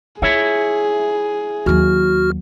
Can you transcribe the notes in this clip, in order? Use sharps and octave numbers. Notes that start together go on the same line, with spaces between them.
E4 F4 G#4 C#5 E5
D#2 F#3 F#4 F6